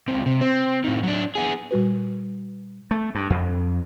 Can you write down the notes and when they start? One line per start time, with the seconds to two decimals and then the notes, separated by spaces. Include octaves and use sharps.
0.08 C#2 C3
0.26 C3
0.41 C4
0.84 A2 D#3
1.03 F#3 D4
1.36 B3 G#4
1.71 A#2 G3 F#4 B4
2.91 A3
3.15 G2
3.30 F2